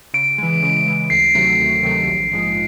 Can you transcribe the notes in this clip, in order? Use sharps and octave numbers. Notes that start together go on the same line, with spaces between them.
C#3 D7
E3 G#3
C#3
E3 G#3
D2 C7
C3 D#3 F#3 A3
D2
C3 D#3 F#3 A3
A#1
G#2 F3 G#3